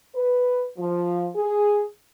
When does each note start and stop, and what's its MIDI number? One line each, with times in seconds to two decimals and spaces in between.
0.16 0.66 71
0.77 1.28 53
1.36 1.85 68